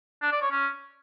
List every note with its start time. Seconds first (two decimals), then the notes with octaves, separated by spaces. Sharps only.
0.22 D4
0.32 D5
0.42 C#5
0.51 C#4